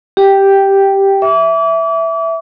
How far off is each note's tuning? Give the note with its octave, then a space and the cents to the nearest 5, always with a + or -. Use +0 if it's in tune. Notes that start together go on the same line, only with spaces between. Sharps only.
G4 +0 G5 +0
E5 +0 D6 -40